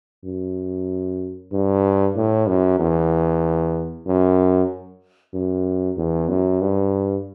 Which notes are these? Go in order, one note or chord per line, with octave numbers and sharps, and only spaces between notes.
F#2
G2
A2
F#2
E2
F#2
F#2
E2
F#2
G2